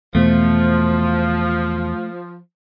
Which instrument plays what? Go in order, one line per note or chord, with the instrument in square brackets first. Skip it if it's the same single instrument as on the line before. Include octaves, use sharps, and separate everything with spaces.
[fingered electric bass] E2 B2 [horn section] F3 [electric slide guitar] A3